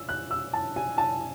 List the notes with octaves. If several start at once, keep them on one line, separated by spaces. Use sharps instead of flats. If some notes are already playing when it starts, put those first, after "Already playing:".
Already playing: E6
F#6
E6
A5
G#5
A5